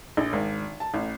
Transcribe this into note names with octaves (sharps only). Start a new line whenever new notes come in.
A#1
G#1
A5
A1